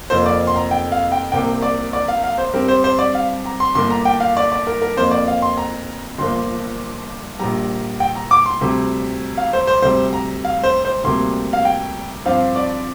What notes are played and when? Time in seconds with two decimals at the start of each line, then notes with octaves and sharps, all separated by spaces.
0.10 F1 F2 F3 A#3 C5
0.26 D5
0.47 C6
0.56 A#5
0.71 G5
0.92 F5
1.12 G5
1.32 C2 C3 A#3 G5
1.62 D5
1.93 D5
2.08 F5
2.24 F5
2.38 C5
2.54 G2 G3 C4 A#4
2.68 C5
2.84 C5
2.99 D5
3.15 F5
3.45 A#5
3.60 C6
3.75 G1 G2 D3 A#3 C6
3.90 A#5
4.05 G5
4.20 F5
4.37 D5
4.52 D5
4.67 A#4
4.82 A#4
4.97 F2 F3 A#3 C5
5.11 D5
5.28 F5
5.42 C6
5.57 A#5
6.18 G1 G2 F3 A#3 C6
7.40 A#1 A#2 G3 A#5
8.00 G5
8.15 A#5
8.31 D6
8.46 C6
8.61 D2 C3 G3
9.37 F5
9.53 C5
9.67 C5
9.82 D2 C3 G3 C5
10.13 A#5
10.44 F5
10.63 C5
10.85 C5
11.04 D2 C3 G3 A#3 C6
11.53 F5
11.65 G5
12.26 G2 F3 C4 F5
12.56 D5